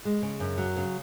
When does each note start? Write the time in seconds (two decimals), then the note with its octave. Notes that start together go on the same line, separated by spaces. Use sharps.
0.05 G#3
0.22 C#3
0.40 F#2
0.58 F#3
0.76 C#3